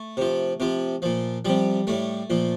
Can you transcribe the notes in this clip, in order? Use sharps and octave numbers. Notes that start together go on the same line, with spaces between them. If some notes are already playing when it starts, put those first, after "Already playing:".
Already playing: A3
C3 F3
C3 F3
A#2 F3
C3 F3 G3
A2 G3 A3
A#2 F3